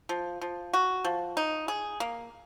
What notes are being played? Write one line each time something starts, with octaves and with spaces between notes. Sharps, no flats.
F3
F3
F#4
F3
D#4
G#4
A#3